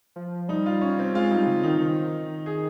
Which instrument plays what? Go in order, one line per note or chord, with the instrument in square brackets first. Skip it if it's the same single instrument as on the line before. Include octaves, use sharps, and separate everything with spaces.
[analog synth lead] F3
[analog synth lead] G3 [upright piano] D#4
[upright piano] F4
C#4
C4
[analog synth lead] G#3 [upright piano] F4
[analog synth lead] G3 [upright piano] D#4
[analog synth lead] C#3
[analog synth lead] D#3 [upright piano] D#4
[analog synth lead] D#3
[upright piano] G#4